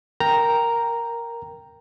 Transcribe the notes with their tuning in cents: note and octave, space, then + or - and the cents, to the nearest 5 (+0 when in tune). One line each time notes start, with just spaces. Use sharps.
A#4 +0 G5 +0 A#5 +0